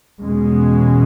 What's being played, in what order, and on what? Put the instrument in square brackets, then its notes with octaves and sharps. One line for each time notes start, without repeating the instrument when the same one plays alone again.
[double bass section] E2 B2 G#3 C#4